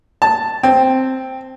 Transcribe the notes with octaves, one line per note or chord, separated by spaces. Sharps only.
A5
C4